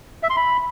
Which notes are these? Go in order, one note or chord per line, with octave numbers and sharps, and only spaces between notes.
E5
C6
B5